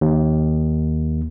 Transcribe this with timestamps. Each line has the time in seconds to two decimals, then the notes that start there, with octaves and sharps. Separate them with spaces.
0.01 D#2